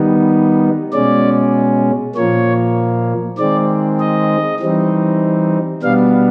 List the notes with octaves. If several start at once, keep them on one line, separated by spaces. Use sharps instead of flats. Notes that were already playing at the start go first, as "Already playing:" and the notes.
Already playing: D#3 G3 B3 D#4
B2 G#3 C#4 D5
A#2 F3 A#3 C#5
D#3 G#3 C4 D5
D#5
E3 G3 C4 D#4
B2 G3 B3 D4 F5